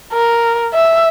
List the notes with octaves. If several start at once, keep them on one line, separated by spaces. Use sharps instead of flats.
A#4
E5